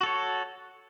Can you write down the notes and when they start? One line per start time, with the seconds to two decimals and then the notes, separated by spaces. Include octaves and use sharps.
0.01 F#4
0.03 A4
0.06 C#5